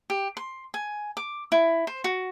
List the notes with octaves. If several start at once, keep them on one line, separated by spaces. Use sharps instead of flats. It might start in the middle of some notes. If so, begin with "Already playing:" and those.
G4
C6
G#5
D6
E4
C5
F#4